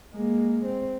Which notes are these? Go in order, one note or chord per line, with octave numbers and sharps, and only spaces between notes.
G#3 A#3
C4